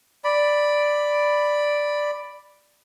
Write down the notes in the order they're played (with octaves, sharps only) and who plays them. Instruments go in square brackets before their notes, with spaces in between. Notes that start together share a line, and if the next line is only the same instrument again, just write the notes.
[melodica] D5 B5